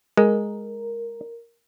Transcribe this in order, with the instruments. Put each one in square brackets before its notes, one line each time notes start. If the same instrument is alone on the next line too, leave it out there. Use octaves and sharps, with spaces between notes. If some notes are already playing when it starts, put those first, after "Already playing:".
[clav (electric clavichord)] G#3 [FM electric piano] A#4